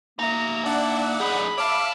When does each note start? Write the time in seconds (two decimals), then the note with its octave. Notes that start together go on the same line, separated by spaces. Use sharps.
0.19 A#3 D#4 E5 A#5
0.66 D4 D5 F#5
1.20 F#2 D#4 G#4 B5
1.58 C#5 E5 F5 A5 D6 F6